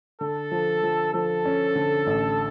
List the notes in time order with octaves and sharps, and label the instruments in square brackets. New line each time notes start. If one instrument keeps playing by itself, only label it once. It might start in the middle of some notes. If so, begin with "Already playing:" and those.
[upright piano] D3 [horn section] A4
[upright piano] F3
F3
[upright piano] F3 [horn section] A4
[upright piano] C#4
D3
A1